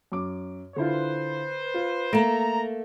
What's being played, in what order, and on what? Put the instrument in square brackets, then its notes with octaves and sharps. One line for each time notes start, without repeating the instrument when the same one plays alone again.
[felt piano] F#2 D6
[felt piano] D3 E4 F4 [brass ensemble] B4 C5
[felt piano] F4
[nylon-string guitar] A3 A#3 [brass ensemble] A#5 [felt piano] A#6 D7 E7